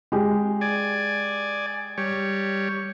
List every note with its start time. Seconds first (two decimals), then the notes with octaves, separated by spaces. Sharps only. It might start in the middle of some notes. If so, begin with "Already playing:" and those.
0.12 G#3 G4
0.61 D5 G#5
1.98 G3 C#5